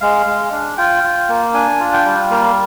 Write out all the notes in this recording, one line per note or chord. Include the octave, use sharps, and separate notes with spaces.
G#3 F5
G#3
D4
F4 G5
F4
A#3
D4 G#5
F4
G5
G3
A#3 F5